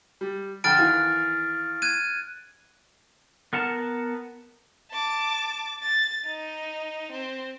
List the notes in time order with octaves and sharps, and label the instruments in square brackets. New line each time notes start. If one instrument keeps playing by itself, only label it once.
[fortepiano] G3
[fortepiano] F2 D3 G5 [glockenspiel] F6 A6 D7
[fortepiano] D#3 E3 F5
[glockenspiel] F#6 G#6 D#7
[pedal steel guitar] B3 A#4 F#5 A5
[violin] A5 D6
A6
D#4
C4